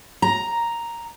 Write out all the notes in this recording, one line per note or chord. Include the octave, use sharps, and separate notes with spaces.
A#5